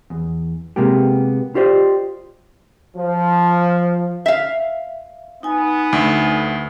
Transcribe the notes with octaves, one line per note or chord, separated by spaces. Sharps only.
E2
C3 G#3 A#3 B3 G4
F4 G4 C5 D5 D#5
F3
E5 F5
B3 D#4 G#5
D2